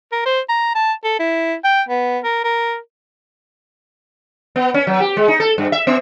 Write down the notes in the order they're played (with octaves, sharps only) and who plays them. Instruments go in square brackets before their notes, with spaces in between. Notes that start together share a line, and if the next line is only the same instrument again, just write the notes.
[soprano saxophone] A#4
C5
A#5
A5
A4
E4
G5
B3
A#4
A#4
[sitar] B3
C#4
F#3
G4
G#3
D#4
A4
G2
E5
B3